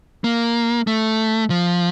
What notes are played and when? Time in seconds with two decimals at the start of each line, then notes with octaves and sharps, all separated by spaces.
0.24 A#3
0.87 A3
1.50 F3